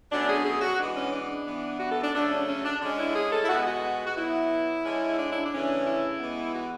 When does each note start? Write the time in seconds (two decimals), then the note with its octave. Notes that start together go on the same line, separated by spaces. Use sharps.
0.11 B2 F#3 A3 C#4 D4
0.28 G#4
0.45 G#4
0.61 F#4
0.78 E3 G#3 B3 D4
0.96 C#4
1.12 D4
1.46 E3 B3
1.79 F#4
1.91 A4
2.03 D4
2.14 C#3 F#3 A3 D4
2.31 C#4
2.48 C#4
2.64 D4
2.81 D3 G#3 C#4 D4
2.98 E4
3.15 G#4
3.32 A4
3.44 E4
3.49 B2 G#3 B3 F#4
3.65 F#4
4.06 F#4
4.16 B2 F#3 B3 E4
4.84 D3 G#3 C#4
5.18 D4
5.31 E4
5.44 D4
5.52 C#3 E3 A3 C#4
5.85 E4
6.19 E3 G#3 B3
6.54 F#4